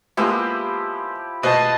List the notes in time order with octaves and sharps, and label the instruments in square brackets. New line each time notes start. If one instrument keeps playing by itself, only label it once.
[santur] F3 E4 G4 [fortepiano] G#3 A#3 B3
[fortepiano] B2 B4 C5 [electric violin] D#5 A5